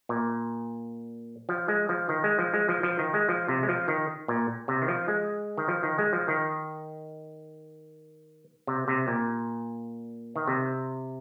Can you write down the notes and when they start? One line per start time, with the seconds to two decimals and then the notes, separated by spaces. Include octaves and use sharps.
0.09 A#2
1.49 F3
1.68 G#3
1.89 F3
2.09 D#3
2.24 G#3
2.39 F3
2.54 G#3
2.69 F3
2.83 F3
2.99 D#3
3.14 G#3
3.29 F3
3.48 C3
3.63 G#3
3.69 F3
3.88 D#3
4.28 A#2
4.68 C3
4.82 D#3
4.88 F3
5.08 G#3
5.58 D#3
5.68 F3
5.83 D#3
5.98 G#3
6.13 F3
6.28 D#3
8.67 C3
8.88 C3
9.08 A#2
10.36 D#3
10.47 C3